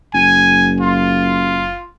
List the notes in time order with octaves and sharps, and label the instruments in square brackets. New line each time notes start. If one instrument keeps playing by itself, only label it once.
[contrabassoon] F#1 [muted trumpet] G#5
[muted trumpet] F4